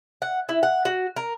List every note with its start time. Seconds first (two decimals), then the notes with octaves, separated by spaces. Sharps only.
0.22 F#5
0.49 E4
0.63 F#5
0.85 F#4
1.16 A#4